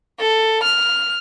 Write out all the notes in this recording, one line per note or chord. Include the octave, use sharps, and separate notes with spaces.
A4
F6